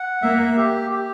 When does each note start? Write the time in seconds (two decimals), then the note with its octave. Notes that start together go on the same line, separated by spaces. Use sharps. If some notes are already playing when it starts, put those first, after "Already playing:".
Already playing: F#5
0.22 A#3 E5
0.57 G4
0.91 G4